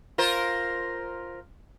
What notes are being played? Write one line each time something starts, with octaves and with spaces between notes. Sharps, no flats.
F4 A#4 C5